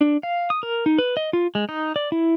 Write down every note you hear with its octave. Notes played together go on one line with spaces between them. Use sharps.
D4
F5
D#6
A#4
D#4
B4
D#5
F4
G#3
D#4
D5
E4